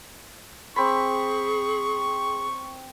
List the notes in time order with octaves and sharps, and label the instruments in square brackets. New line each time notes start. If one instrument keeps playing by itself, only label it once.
[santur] C4 B5 [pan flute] G#4 [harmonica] C#6